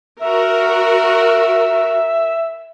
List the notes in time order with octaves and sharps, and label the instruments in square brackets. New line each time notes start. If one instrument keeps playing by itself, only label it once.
[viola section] F#4 A#4 [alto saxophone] E5